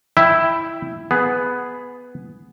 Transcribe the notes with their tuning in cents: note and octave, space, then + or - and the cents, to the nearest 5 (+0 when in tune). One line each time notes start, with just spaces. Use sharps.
E4 +0 E5 +0 G5 +0
B3 +5 G#4 +5